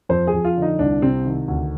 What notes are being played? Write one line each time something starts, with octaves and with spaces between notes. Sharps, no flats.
F2 C5
G#4
F2
F4
D3
D#4
C2 D4
C3 C4
D#3
D2